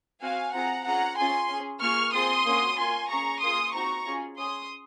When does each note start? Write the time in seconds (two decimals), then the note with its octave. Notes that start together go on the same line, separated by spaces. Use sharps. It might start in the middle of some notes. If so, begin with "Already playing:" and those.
0.21 C4 F#4 F5 G#5
0.53 C4 F4 G#4 F#5 A#5
0.86 C#4 F4 G#4 F#5 A#5
1.18 C#4 F4 G#4 G#5 C6
1.49 C#4 G#4
1.81 A#3 F4 G#4 C#6 F6
2.13 C4 F4 G#4 C6 D#6
2.46 A#3 C#4 F#4
2.77 A#3 C#4 F4 G#5 C6
3.10 C#4 G#4 A#5 C#6
3.42 A#3 F4 G#4 C6 D#6
3.74 C4 D#4 F#4 A#5 C#6
4.06 C#4 F4 G#4
4.38 C#4 G#4 C6 D#6